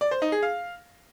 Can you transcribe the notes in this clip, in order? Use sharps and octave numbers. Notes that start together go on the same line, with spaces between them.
D5
C5
D#4
G#4
F5